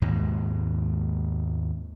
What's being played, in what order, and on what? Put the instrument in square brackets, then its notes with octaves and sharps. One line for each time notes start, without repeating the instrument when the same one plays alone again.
[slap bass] D#2 G#2 B2 G#3